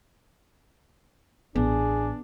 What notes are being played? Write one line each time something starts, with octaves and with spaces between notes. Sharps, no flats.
A1 B3 D4 G#4